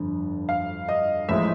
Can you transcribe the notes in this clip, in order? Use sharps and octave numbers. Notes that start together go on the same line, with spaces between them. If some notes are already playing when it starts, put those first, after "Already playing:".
Already playing: G1 F2 D3
F5
D#5
A1 A2 F3 G#3 E5